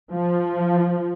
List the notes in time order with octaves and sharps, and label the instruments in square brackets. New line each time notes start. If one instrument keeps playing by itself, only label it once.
[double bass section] F3